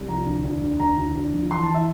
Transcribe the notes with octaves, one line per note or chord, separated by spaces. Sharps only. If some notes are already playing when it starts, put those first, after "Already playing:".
Already playing: C2
F3 A#5
D2
D2
D2
D2 A#5
D2
D2
F3
E3 C6
A5
E3
E5